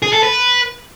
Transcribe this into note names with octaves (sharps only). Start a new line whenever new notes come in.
G#4
A4
B4